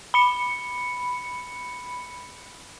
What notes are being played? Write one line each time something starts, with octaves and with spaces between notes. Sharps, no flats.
B5 C#7